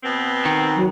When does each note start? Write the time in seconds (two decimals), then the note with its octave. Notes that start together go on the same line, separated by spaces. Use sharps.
0.03 B2 B3 C4
0.45 D#3
0.76 F#3